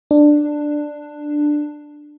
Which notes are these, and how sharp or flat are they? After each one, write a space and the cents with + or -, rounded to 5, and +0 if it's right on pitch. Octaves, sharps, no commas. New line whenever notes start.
D4 +10